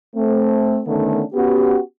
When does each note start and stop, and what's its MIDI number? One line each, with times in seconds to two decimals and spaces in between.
0.15 0.79 57
0.15 0.79 60
0.86 1.22 50
0.86 1.22 51
0.86 1.22 57
0.86 1.22 59
0.86 1.22 61
0.86 1.22 62
1.33 1.78 59
1.33 1.78 61
1.33 1.78 66
1.33 1.78 67